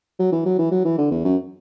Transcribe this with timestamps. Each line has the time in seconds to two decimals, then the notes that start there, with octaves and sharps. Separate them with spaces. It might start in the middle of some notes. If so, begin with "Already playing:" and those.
0.19 F#3
0.32 E3
0.45 F#3
0.59 E3
0.71 F#3
0.85 E3
0.98 D3
1.11 E2
1.25 F#2